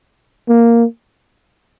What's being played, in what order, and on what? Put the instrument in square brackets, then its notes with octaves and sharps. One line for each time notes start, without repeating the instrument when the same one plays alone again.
[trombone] A#3